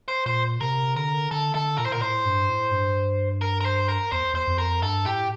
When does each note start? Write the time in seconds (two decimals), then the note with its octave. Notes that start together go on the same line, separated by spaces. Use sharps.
0.08 C5
0.26 A#2 C5
0.61 C3 A#4
0.96 D3 A#4
1.31 D3 A4
1.55 D3 A4
1.78 A#2 A#4
1.86 A2 C5
1.93 A#2 A#4
2.02 A2 C5
2.25 G2
2.49 A2
2.71 G2
3.41 A#4
3.61 A#4
3.65 C5
3.89 A#4
4.12 E2 C5
4.33 E2 C5
4.48 F2
4.58 A#4
4.82 G2 A4
5.06 A2 G4